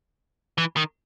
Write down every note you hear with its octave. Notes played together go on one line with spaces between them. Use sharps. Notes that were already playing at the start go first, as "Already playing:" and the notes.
E3
D#3